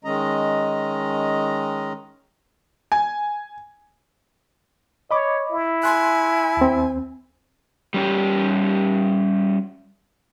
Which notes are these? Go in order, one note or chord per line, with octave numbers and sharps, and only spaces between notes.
D#3 G#3 C#4 D#5 A#5
G#5
C#5 D#5 B5 D6
E4
G#5 C6 F#6
D#2 C4
G3 C#4 G4